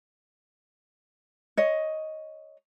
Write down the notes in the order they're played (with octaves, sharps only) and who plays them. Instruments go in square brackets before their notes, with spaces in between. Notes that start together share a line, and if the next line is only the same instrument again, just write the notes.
[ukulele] C#5 D#5